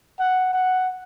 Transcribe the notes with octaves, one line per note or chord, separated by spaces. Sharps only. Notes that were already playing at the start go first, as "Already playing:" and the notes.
F#5
F#5